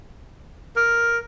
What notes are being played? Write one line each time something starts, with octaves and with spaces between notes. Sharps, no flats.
A#4